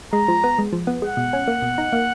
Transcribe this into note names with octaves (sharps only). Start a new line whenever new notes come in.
G#3 A#5
F3
B3
G#3
F3
B3
G#3 F#5
B2
C#4
A#3
B2
D#4
A#3